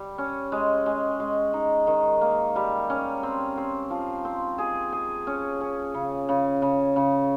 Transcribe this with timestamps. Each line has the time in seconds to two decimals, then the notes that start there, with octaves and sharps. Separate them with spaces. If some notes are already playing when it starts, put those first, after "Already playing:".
Already playing: G3
0.18 C#4
0.52 G#3
0.86 G#3
1.20 G#3
1.53 D#4
1.87 D#3
2.21 A#3
2.56 G3
2.90 C#4
3.23 C4
3.57 C4
3.90 F3
4.25 C4
4.58 G#4
4.92 G#4
5.27 C#4
5.61 C#4
5.94 C#3
6.29 C#3
6.62 C#3
6.96 C#3